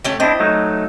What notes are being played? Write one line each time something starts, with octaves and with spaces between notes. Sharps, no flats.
A3 C#4 G4
C4 D4 E4 D#5
F#3 A3 D#4